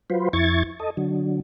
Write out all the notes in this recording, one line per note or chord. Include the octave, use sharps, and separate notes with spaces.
F#3 F4 B4 C5
F2 E4 C#6 G#6 A6
A4 D#5
D3 F#3